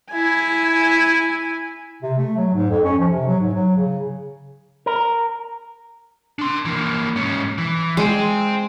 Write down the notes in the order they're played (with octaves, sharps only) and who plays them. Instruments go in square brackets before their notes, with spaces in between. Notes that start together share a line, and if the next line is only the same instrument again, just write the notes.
[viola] E4 G#5
[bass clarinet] C3
A3
F#3
G#2
F2
C#4
F3
C3
F#3
G#2
F#3
C#3
[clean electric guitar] A#4
[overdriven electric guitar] D4 C6
E3 A#3
G#2 C#4
E3
[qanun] G#3 [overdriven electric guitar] C5 G5